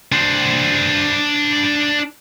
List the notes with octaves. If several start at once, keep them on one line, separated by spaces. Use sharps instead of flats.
D4 C5